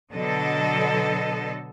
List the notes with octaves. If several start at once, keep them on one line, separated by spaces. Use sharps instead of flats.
B2 D3 F#3 A4 D#5